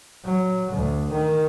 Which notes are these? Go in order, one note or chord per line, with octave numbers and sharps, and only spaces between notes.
F#3
D2
D#3